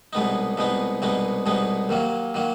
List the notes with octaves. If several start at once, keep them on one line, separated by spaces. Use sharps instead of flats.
C2 B2 G#3 B3 D#4
C2 B2 G#3 B3 D#4
C2 B2 G#3 B3 D#4
C2 B2 G#3 B3 D#4
D#2 D#3 F#3 A#3
D#3 F#3 A#3